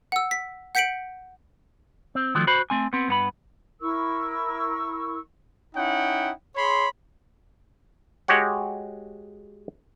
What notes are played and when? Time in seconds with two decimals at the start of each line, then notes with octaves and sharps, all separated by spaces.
0.12 F#5 E6
0.31 B6
0.75 F#5 G6 B6 C#7 D7 F#7
2.15 C4
2.35 D#3 F3 F#3 A3
2.47 F#4 C5 B5
2.70 A3 C4 G#5
2.93 B3 C4
3.08 G2 B3 B5
3.81 E4 A#4 C#6 E6
5.75 C#4 D#4 E4 F#5 G5
6.55 G#4 C#5 B5 C6
8.28 G#3 F#4 G4 C#5 F#5